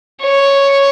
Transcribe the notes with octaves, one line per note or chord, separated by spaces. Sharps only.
C#5